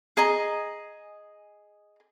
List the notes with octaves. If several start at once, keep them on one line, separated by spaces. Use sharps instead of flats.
G#4 D#5 A#5